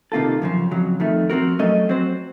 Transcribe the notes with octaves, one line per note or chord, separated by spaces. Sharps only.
C3 D#3 A#3 F4 A4
F#2 C#3 F3
F2 C#3 F#3
F2 D#3 A3
F3 C4 F#4 A#4
F#3 A3 C#4 A4 D#5
F#3 C4 F#4 C5